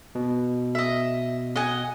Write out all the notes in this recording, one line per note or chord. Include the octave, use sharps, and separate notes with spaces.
B2
D#5 E5
D#5 F#5 G#5